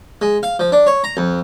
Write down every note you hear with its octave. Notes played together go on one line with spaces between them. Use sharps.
G#3
F5
F3
D4
C#5
A#5
F2